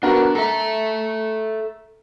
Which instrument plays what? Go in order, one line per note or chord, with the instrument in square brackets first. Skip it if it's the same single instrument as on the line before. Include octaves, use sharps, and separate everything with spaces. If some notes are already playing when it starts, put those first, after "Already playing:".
[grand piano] B3 F#4 A#4 [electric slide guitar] D4
[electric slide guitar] A4 E5 [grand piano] A#5